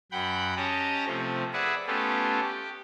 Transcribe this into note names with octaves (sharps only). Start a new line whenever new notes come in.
F#2 F#5 G5 B5 G6
C#4 G4 C#5 D#5 A5 A#5
C3 F3 A3 C4
G#4 B4 D5 E5 F#5
A3 B3 C#4 F4 G4 A4
G4